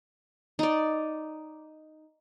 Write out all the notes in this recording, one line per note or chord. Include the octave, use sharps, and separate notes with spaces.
D#4 D5